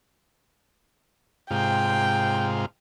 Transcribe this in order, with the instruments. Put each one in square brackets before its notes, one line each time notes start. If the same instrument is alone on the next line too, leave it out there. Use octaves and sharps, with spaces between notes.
[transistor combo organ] G#2 C3 F4 [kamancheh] G5